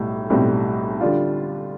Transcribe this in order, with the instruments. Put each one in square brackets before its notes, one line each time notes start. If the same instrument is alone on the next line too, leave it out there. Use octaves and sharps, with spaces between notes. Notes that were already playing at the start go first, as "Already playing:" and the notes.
Already playing: [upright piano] B1 A2 G3
B1 A2 G3 C4
D3 G3 D4 F4